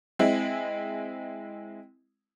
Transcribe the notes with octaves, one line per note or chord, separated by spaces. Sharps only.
G#3 C4 E4